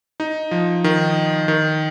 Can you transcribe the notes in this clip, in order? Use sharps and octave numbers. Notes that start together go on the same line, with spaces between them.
D#4
F3
D#3
D#3